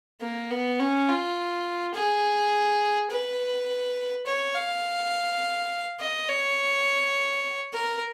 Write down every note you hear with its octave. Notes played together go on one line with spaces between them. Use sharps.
A#3
B3
C#4
F4
G#4
B4
C#5
F5
D#5
C#5
A#4